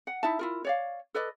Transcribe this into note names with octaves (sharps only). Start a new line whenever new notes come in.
F#5
D#4 E4 E5 A5
E4 F4 A#4
C#5 D5 F5
A4 B4 D5 D#5